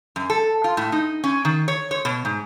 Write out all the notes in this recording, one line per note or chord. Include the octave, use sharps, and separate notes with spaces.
F#2
A4
F4
A2
D#4
C#4
D#3
C#5
C#5
B2
G#2